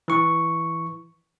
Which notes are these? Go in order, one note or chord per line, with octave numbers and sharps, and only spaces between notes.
E3 C#6